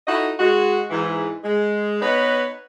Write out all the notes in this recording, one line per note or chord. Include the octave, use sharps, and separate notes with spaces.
D#4 E4 F#4 A4 D#5
G#3 F#4
G#2 E3
G#3
B3 D#4 B4 C#5